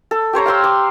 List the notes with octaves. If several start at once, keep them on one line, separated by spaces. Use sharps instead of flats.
A4
G4 C5 C#5 A#5
F5 G5 C6 E6
D6